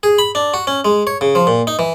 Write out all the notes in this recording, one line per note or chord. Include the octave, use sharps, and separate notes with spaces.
G#4
B5
D4
F#4
C#4
G#3
C#5
C#3
F3
A#2
D#4
E3